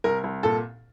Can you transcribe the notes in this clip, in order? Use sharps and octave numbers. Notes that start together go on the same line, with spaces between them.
C2 A#4
C2
A#2 A4